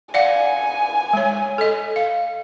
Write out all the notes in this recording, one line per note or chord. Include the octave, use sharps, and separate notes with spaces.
D5 F5 F#5 G#5
G#3 C#5
A4 D#5
F5